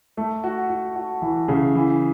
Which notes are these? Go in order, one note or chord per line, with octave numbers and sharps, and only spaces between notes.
A3
F#4
F#4
F#4
E3
C#3
E3